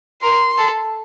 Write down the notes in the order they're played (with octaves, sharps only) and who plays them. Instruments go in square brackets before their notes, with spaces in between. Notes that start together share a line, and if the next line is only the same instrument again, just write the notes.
[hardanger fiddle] A#4 [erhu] C6
[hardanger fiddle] A4